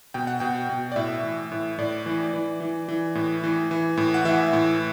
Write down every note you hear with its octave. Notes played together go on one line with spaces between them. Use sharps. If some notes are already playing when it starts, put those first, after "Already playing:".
B2 G5
F#5
B2 G5
B2
D5
A2 E5
E3
A2
A2 D5
E3
E3
E3
E3
A2
E3
E3
A2
F#5
E3 E5
A2